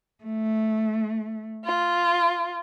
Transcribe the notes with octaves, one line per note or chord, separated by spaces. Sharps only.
A3
F4